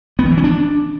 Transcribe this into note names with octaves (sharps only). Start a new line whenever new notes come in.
B3
D#3
E3
C#4
D4